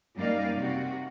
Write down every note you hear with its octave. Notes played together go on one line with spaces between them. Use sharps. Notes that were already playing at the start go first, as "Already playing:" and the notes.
F#2 G3 A#3 D#4 D5 F5
C3 F#4